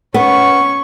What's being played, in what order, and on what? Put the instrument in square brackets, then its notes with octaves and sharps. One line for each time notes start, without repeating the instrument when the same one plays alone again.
[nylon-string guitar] B3 [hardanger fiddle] C#4 C#6